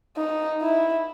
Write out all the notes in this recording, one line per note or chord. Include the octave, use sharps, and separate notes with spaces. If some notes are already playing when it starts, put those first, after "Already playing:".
D#4
E4